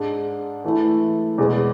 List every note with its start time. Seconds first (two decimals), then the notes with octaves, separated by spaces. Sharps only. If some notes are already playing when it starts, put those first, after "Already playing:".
Already playing: G#2 G#3 D4
0.64 E3 A3 E4
1.38 E2 B2 G#3 B3